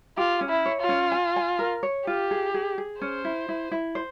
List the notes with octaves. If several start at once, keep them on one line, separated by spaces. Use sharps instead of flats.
F4 G4
C#4
E4
C#5
F4
C#4
G#5
G#5
A#4
C#5
F4 G4
G#4
G#4
G#4
C#4 C5
E4
E4
E4
C5